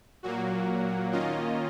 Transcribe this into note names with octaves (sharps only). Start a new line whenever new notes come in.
A#2 F#3 A#3 F#4
D#3 A#3 C#4 F4 D#5